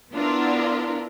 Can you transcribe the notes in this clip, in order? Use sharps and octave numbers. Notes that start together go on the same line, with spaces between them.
B3 D4 E4 F4 A#4